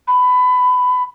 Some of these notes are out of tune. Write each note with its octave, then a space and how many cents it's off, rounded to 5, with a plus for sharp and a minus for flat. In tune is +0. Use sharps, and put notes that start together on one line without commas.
B5 +20